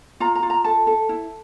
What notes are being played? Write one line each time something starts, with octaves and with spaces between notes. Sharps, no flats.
F4 A#5
A#5
F4
A#5
A4 A5
A4
E4